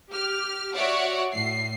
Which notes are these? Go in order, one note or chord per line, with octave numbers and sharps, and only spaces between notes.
G4 F6
F#4 C#5 D5 E5 F#5
A2 C7